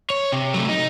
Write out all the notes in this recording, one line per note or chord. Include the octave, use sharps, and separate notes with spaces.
C#5
C3
F#3 A3
D#4